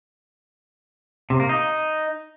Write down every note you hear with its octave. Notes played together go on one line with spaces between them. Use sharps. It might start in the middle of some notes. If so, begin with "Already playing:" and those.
C3
A#3
D#4